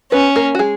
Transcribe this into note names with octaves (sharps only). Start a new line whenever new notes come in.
B3 C#4 B4
A#3 A#4
F#4
G#3 G#4